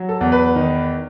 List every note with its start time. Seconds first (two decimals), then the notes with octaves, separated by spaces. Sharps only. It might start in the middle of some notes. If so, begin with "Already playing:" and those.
Already playing: F#3
0.09 A4
0.21 E2
0.32 B4
0.56 D#3